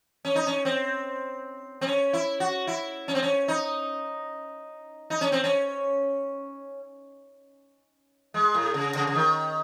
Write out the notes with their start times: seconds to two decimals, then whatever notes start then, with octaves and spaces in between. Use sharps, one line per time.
0.25 C#4
0.35 D#4
0.47 C#4
0.65 C4
1.81 C4
1.87 C#4
2.13 E4
2.40 F#4
2.67 E4
3.08 C#4
3.15 C4
3.23 C#4
3.48 D#4
5.10 D#4
5.21 C#4
5.32 C4
5.44 C#4
8.34 G#3
8.54 A2
8.74 C#3
8.95 C#3
9.07 C#3
9.15 D#3